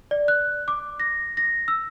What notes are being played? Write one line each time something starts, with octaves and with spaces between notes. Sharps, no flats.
D5
F#6
D6
A#6
A#6
E6